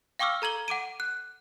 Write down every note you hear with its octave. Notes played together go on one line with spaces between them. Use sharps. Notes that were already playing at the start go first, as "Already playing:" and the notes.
F5 G5 C#6 D6 E6 F6
A4 A#5 G#6 F#7 G7
F#5 D6 D7 D#7
F#6